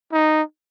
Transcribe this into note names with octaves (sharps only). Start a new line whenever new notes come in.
D#4